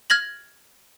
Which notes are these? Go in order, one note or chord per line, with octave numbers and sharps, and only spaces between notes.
F6 G#6 A#6 F#7